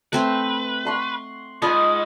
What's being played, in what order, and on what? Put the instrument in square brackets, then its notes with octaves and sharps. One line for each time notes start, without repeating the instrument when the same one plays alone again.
[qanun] A3 C4 C5 [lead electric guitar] B4
[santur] F#5 C6 C#6
[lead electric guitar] G#2 [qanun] F4 [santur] D#5 B5 D#6